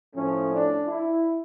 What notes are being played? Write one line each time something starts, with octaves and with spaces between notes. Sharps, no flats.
A2 F3 A3 C#4
D4
E4